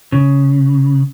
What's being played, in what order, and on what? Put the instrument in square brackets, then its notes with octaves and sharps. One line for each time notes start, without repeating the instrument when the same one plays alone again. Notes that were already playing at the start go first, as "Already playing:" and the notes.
[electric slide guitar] C#3